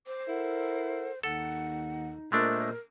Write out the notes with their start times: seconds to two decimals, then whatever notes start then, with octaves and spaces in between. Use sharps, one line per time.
0.07 C5 D6
0.28 E4 A4 A#4 F#5
1.23 D#2 D#4 A4 F#5
2.32 A#2 G#3 A3 D4 A#4 C5 D#5 E5